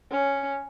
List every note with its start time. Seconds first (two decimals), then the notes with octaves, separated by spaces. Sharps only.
0.11 C#4